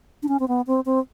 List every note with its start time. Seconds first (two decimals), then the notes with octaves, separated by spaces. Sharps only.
0.23 D4
0.28 C#4
0.40 C4
0.48 B3
0.67 C4
0.86 C4